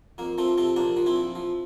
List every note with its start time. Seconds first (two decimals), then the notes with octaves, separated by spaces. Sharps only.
0.18 F2 A#3
0.38 F3 A3 C4
0.58 C3 A3 C4
0.76 A#1 A#3 D4
0.97 F3
1.06 C4 E4
1.16 A#1
1.35 F3